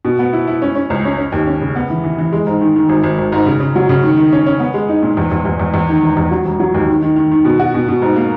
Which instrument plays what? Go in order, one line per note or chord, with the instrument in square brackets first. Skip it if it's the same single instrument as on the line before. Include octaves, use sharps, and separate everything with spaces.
[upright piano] B2
B3
E4
E4
C#4
C#4
C#2
C#4
C#4
D#2
C#4
C#3
B3
E3
E3
E3
G#3
G#2
D#3
D#3
G#1
G#1
G#1
G#2
C#3
C#3
F#3
C#3
D#3
D#3
C#4
C#4
B3
G#3
D#4
A#2
E2
E2
E2
E2
E2
D#3
E1
E2
F#3
E1
F#3
D#2
D#3
D#3
D#3
D#3
B2
F#4
B2
B2
G#2
A#3